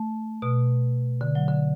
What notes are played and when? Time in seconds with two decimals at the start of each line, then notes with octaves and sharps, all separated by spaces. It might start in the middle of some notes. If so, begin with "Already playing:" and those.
Already playing: A3
0.42 B2
1.21 D3
1.35 F#3
1.48 D3